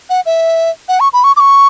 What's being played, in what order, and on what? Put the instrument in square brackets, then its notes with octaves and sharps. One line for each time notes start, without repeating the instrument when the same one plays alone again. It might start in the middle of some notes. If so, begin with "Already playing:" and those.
[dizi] F#5
E5
F#5
C#6
B5
C#6
D6
C#6